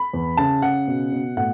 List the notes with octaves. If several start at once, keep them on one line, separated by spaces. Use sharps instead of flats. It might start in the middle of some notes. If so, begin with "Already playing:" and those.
Already playing: B5
E2
C#3 A5
C#3 F#5
B2
B2
A2 F#5